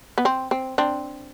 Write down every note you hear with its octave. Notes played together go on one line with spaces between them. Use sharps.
B3
C4
C4
C4 D4